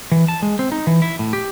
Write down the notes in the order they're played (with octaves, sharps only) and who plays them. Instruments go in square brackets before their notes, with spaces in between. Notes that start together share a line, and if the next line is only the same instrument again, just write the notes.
[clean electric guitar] E3
A5
G#3
C4
D#4
E3
E4
A2
G4